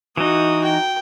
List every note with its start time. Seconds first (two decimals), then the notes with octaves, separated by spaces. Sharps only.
0.17 E3 D#4 F#4 D#6
0.64 G5